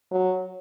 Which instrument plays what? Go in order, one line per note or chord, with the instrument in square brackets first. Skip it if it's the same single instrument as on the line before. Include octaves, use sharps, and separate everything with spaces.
[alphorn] F#3